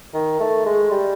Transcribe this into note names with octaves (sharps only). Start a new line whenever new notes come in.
D#3
A3
G#3
G3